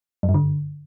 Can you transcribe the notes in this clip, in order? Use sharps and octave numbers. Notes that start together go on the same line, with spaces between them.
F#2
G2
D3